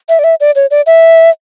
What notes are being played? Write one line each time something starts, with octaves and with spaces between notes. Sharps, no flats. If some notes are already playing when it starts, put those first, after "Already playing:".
E5
D5
E5
D5
C#5
D5
E5